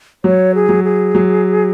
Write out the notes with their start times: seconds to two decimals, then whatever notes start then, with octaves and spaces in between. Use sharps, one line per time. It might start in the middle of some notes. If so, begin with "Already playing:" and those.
0.24 F#3 C#5
0.55 G#4
0.69 F#3
0.84 G#4
1.15 F#3